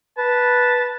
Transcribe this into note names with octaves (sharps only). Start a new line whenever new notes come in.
B4 A5